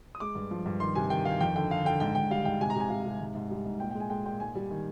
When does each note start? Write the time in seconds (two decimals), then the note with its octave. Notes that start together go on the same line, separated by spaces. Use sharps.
0.15 D#6
0.20 G#3 D6
0.35 G2
0.51 F3
0.66 G2
0.80 D#3 C6
0.95 C3 G#5
1.10 D#3 G5
1.25 D#3 F5
1.41 F2 G5
1.55 D3 G5
1.70 D3 F5
1.85 D3 G5
2.00 G#2 G5
2.15 G#2 G5
2.30 G3 F5
2.45 G#2 G5
2.61 C3 G#5
2.70 A#5
2.75 C3 G#5
2.90 C3 F5
3.06 C3
3.20 G#2
3.35 G#2
3.51 G3
3.65 G#2
3.80 A#2 G5
3.91 G5
3.95 G#3
4.00 G#5
4.10 G#3 G5
4.25 A#2 G5
4.40 G#2 G#5
4.55 G3
4.71 D#3